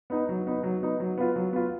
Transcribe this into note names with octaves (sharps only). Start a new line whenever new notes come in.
B3 D#4
F#3
B3 D#4
F#3
B3 D#4
F#3
B3 F4
F#3
B3 F4